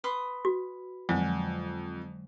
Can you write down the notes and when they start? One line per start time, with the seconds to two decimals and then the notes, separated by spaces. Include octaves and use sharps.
0.04 B4 C6 D#6
0.45 F#4
1.09 F2 D3 F#3 G#3